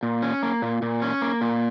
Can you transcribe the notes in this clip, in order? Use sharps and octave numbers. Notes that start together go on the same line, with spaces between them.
A#2
C#4
A#3
A#2
A#2
C#4
A#3
A#2